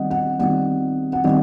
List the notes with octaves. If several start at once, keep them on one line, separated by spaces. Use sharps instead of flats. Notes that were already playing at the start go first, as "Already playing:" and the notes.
Already playing: D#3 G3 C4 D#5 F#5
F#5
D#3 G3 C4 F#5
F#5
D#3 G3 C4 D#5